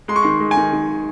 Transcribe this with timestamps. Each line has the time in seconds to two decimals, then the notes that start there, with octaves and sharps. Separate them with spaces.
0.08 G#3 C6
0.16 C#6
0.23 D#3 C6
0.40 G#3
0.51 G#5
0.57 D#3
0.73 D#3